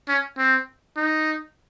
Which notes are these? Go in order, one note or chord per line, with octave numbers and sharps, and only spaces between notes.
C#4
C4
D#4